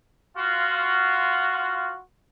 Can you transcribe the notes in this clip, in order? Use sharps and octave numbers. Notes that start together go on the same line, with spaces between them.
F4 F#4